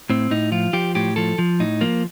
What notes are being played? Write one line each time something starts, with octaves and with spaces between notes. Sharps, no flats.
A2 C4
A2 D#4
F3 F4
F3 G4
A2 G4
F3 A4
F3
A2 D#4
F3 A#3